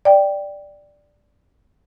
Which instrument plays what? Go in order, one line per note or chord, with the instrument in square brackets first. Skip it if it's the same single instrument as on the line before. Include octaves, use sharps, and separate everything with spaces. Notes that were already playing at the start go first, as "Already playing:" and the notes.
[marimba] D5 G5